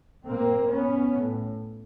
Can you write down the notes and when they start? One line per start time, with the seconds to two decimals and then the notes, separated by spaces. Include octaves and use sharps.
0.28 A#2 A#3 C4
0.72 B3 C#4
1.17 A2